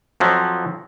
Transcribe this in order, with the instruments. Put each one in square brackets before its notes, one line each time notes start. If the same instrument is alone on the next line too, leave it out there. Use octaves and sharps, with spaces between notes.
[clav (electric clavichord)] F2 F3 F#3